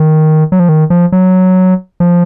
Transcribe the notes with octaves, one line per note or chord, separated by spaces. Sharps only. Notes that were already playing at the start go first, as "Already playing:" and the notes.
Already playing: D#3
F#3
F3
D#3
F3
F#3
F3